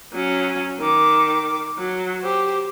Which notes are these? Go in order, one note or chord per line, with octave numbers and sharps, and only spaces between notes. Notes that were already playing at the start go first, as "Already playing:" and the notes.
F#3 C#4
D#3 D6
F#3
G4 C5